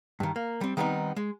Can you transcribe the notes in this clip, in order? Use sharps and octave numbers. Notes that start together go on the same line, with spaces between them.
G2 D#3
A#3
G3 C4
D#3 G3 B3 C4 D4 D#4
G#3